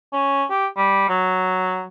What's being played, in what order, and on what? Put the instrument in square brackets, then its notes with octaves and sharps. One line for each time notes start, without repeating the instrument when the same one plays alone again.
[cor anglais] C#4
G4
G3
F#3